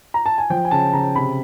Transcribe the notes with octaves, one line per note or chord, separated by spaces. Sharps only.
A#5
A5
G#5
F3 G5
G#5
C#3 A5
C#3 A#5
C3 B5